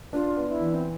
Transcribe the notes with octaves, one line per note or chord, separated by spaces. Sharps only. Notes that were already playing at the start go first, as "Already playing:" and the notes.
D4 F4
B3
E4
E3
C4